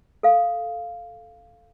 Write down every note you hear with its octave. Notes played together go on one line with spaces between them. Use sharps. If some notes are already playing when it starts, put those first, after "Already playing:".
A4 F5